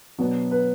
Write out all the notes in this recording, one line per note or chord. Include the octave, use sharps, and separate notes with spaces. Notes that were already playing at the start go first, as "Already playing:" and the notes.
B2 F#3 B3 D4
B4